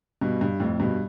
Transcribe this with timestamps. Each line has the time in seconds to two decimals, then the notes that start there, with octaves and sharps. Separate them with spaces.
0.21 G2 B2
0.41 G2
0.60 F2 A2
0.79 G2 B2